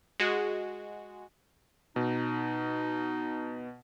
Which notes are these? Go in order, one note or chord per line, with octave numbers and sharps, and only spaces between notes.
G#3 F#4
B2 D#4